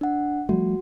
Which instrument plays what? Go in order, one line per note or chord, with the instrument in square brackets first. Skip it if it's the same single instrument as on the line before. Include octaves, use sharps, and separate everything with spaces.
[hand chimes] D4 F#5
[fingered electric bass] F3 G3 A3 [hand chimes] F#4